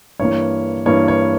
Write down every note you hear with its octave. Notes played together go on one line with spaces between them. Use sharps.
G2 E3 A#3 C#5
G2 E3 A#3 C#5
C#5